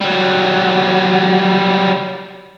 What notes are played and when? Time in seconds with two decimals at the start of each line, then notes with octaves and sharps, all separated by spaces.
0.01 F#3 G3